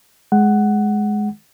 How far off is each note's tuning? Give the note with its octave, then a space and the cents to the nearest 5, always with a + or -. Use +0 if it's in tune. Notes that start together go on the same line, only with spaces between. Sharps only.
G#3 +10 F#5 +10